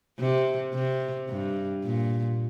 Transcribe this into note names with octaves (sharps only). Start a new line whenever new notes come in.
C3
C3
G2
A#2